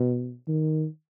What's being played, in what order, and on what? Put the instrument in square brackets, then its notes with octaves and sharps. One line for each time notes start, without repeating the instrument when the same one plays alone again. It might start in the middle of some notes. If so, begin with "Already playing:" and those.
Already playing: [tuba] B2
D#3